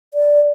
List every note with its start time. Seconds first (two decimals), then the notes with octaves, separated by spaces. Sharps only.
0.14 D5